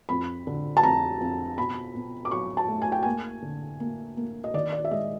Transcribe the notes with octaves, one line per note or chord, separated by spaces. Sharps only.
F2 B5
D3
A5
F2 A#5
F2
B2 B5
B2
D6
F#3 C#6
A5
A3
G#5
G5
A#3 G#5
D3
A#3
A#3
D#5
D#3 D5
D5
E5
G#3 D#5